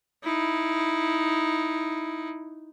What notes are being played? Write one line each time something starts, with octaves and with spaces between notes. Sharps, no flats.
D#4 E4